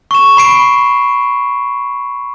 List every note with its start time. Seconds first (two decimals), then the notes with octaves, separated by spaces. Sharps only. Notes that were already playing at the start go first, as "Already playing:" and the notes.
0.11 C#6 E7
0.37 B5 C7 D7